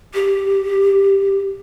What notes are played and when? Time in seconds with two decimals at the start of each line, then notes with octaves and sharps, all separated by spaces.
0.14 G4